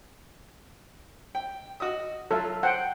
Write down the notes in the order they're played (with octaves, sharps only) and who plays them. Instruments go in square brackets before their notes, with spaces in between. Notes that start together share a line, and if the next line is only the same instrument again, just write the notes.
[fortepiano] G5
F#4 D#5 D#6
[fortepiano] F#3 F4 E5 [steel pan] A4
[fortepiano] C5 [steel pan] F#5 G5